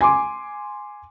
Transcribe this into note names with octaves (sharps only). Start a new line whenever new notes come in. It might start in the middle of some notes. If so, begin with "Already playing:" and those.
G#5 C6 D6